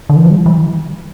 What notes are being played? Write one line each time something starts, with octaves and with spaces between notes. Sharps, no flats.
D3
E3
F3
G3
E3